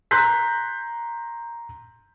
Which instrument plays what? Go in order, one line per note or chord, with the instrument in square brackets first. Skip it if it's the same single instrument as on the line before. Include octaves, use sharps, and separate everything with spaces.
[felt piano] A#5 C6 F#6 G6 B6